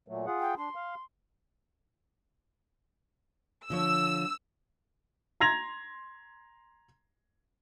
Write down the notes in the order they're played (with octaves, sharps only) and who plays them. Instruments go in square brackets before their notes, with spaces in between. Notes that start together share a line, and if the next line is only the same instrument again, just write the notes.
[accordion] A#2 F#3 A3
F4 G#4 F#5
[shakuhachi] G5
[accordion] D4 [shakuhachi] C6
[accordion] F5
[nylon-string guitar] D3 F3 C#5 [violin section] E6
[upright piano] A#5 C6 G#6 A#6 F7